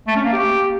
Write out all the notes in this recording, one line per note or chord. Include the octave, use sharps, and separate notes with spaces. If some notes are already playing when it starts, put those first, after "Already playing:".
A3
C#4
A#3
G4